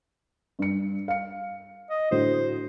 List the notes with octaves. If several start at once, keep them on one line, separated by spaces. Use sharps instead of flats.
G2 C#7
F5 C#7
D#5
A2 D3 F#4 C5